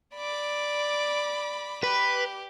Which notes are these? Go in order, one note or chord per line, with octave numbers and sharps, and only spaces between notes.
D5 B5 D6
G4 B4